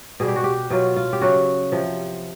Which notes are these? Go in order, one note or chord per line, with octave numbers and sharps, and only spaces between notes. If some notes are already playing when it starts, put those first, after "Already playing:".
B2 G3 G#4
G4
F#4
G4
B2 F#3 F4
F4
G4
C#3 F#3 F#4
C3 F3